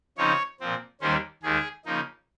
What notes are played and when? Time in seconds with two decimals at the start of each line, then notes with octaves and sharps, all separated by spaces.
0.17 C#3 F3 C4 D#4 C#5
0.60 A#2 F3 C4
1.01 D#2 D#3 G3 A#3 C#4 C5
1.43 D#2 D#3 G#3 G#4
1.85 C#3 F3 A#3 D#4